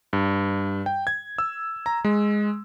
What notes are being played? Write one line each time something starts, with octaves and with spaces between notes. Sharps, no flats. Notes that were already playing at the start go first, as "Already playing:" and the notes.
G2
G5
G#6
E6
A#5
G#3